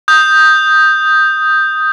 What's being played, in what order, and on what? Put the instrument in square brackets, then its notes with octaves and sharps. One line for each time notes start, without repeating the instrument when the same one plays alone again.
[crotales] D#6 G6